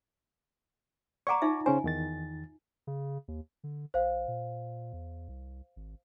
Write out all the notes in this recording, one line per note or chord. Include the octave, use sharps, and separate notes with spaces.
D5 F#5 A#5 C#6 D6
D#4 F4 E5
C#3 C#4 C5 G#5
E2 D#3 A6
C#3
D#2
D3
A#1 C5 F5
A#2
E2
C2
G#1